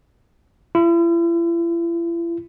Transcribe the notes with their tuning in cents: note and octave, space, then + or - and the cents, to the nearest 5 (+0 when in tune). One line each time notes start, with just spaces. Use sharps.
E4 +40